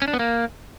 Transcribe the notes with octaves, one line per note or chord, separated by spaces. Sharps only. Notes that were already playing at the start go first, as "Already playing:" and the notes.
C#4
D4
B3
A#3